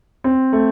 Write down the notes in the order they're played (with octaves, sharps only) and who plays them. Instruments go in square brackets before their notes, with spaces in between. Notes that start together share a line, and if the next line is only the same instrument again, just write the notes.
[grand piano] C4
A3